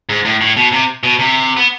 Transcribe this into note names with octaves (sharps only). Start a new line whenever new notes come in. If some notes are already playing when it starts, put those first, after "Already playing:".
G#2
A2
A2
B2
C3
B2
C3
B3